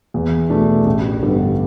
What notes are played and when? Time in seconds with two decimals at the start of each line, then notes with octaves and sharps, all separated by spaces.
0.14 E2
0.50 B2 A3 D4
0.86 A1
1.22 G2 D3 G3 B3